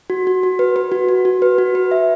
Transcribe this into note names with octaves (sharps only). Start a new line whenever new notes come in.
F#4
F#4
F#4
B4
B4
F#4
F#4
F#4
B4
F#4
B4
E5